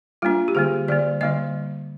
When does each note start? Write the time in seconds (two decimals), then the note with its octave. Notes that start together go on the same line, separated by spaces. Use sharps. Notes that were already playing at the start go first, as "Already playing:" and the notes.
0.22 G3 A#3 D4 F4
0.48 G4
0.55 D3 G3 A#3 G#4
0.88 D3 G3 A#3 D5
1.21 D3 G3 A#3 D#5